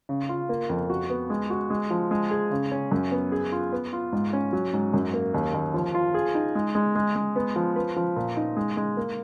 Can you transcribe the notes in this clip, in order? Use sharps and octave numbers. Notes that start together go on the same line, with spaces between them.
C#3
F4
A#3
F2
F#4
B3
G#3
F#4
G#3
F3
G#3
G#4
C#3
C#4
F#2
B3
G#4
F4
B3
F4
G#2
C#4
F#3
G#2
F#2
A#3
D#2
D#2
F3
F4
G#4
D#4
G#3
G#3
G#3
G#3
B3
F3
B4
F3
A#2
D#4
G#3
G#3
A#3